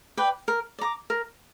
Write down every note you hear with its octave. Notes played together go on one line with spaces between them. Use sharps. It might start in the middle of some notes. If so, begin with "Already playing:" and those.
B4 D5 G5
A#4
D5
A#5 D6
A#4